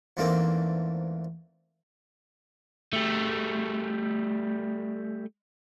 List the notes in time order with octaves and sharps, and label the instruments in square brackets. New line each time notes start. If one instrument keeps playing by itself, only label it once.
[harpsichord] E2 G#2 A3 A#3 C4 D4
[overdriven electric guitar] G3 A3